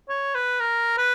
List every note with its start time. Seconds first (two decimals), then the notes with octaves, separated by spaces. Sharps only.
0.09 C#5
0.35 B4
0.60 A#4
0.98 B4